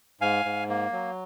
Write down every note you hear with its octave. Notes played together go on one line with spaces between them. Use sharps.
G#2 F5 G#5
G#2
A#3
F#3